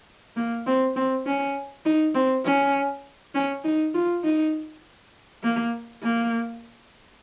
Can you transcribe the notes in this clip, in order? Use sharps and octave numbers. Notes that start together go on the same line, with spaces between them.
A#3
C4
C4
C#4
D#4
C4
C#4
C#4
D#4
F4
D#4
A#3
A#3